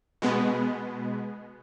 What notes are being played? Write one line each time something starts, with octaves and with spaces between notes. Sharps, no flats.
B2 G#3 B3